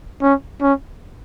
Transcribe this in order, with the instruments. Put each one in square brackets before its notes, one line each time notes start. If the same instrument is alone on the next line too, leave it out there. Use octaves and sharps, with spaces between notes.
[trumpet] C#4
C#4